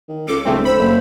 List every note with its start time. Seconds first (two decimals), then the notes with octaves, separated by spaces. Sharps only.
0.09 D#3
0.28 C#2 A4 D6
0.45 D1 C#3 G#3 A3 C4
0.65 C5 B5 E6
0.79 F#1